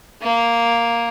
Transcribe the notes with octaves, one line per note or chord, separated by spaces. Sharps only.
A#3